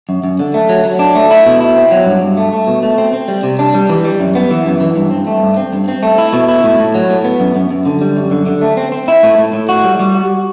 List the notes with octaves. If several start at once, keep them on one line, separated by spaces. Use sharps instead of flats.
F#2
F#2
D3
A3
F#3
F#3
D4
A3
E4
B2
E4
C4
F#3
G2
G2
A3
A3
B2
A3
C4
C4
G3
C3
D4
G3
E3
G3
F#2
B3
E3
F#2
E3
G2
C4
A3
G2
C4
G2
C4
A3
E4
B2
E4
A2
A2
F#3
A2
B3
F#2
F#2
F#2
D3
G3
F#2
D3
D3
A3
C4
C4
E4
A2
A2
A2
F#4
G3
G3
F#4